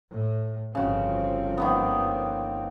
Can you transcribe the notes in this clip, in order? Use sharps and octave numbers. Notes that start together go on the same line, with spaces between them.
A2
G1 C#3 F3 C4 F#4 G5
D#3 A#3 B3